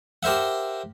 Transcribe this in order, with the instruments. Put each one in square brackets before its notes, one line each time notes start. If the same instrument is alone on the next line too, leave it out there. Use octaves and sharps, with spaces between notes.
[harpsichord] G4 A#4 C5 E5 F#5